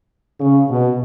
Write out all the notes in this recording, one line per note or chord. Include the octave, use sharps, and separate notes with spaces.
C#3
B2